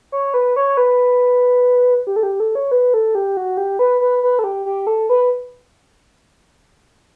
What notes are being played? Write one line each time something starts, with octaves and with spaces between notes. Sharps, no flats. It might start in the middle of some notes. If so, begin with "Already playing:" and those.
C#5
B4
C#5
B4
G4
A4
G4
A4
C#5
B4
A4
G4
F#4
G4
B4
B4
B4
A4
G4
G4
A4
B4